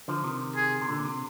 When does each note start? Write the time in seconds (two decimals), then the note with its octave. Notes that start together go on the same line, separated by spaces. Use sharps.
0.08 D3 F3
0.24 C3 D#3
0.56 G#4
0.81 C3
0.89 A#2 D3
1.05 C3